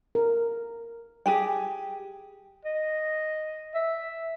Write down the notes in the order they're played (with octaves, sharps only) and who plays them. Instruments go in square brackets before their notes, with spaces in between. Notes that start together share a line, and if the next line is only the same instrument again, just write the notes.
[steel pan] A#4
[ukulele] G4 G#4 G5
[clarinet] D#5
E5